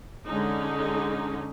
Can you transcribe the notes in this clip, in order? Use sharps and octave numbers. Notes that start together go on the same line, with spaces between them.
D3 G#3 C#4 D#4